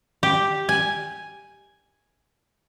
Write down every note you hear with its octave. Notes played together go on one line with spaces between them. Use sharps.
G4
G#5